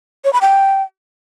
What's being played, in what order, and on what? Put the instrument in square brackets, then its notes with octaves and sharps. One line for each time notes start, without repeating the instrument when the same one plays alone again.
[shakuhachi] C#5
B5
G5